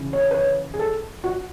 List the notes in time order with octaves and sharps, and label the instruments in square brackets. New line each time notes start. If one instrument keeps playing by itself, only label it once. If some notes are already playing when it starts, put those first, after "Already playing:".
Already playing: [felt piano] C#3 E3
C#5
B4
C#5
G#4
A4
F#4